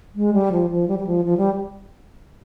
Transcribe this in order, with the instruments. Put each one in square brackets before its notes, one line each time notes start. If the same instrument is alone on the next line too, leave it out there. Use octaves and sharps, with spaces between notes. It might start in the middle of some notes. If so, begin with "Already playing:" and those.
[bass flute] G#3
G3
F3
F3
G3
G3
F3
F3
G3